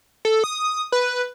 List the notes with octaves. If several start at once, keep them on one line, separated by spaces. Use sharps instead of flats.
A4
D#6
B4